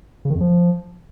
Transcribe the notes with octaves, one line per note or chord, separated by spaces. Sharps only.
C#3
D#3
F2
F3